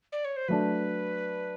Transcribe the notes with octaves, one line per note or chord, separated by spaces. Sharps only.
D5
C#5
C5
F#3 A3 D4 B4